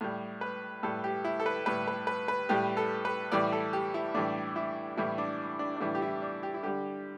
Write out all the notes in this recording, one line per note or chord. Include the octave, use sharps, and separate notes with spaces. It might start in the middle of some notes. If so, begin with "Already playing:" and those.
A2 G3
B4
A2 G3 A4
G4
E4
A4
B4
A2 G3 B4
B4
B4
B4
A2 G3 G4
A4
B4
A2 E3 G3 D5
A4
G4
E4
A2 E3 G3 D4
E4
A2 E3 G3 E4
D4
D4
D4
A2 E3 G3 E4
G4
E4
D4
G4
E4
D3 G3 G4